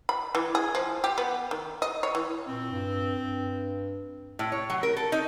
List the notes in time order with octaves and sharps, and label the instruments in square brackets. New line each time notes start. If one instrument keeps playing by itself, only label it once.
[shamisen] B5
E3
G#4
F3
G4
B3
D#3
D#5
C#5
E3
[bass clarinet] A#2 [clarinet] C4
[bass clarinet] G2
G2
[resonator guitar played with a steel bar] A2
C#5
F#3
A#4
A4
D#4